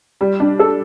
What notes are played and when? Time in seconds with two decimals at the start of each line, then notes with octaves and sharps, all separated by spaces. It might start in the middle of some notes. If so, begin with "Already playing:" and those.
0.21 G3
0.40 D4
0.59 A4